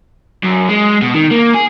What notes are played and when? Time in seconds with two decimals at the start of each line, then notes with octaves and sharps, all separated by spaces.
0.43 F#2
0.69 G#3
1.02 B2
1.15 D#3
1.31 A#3
1.54 G#4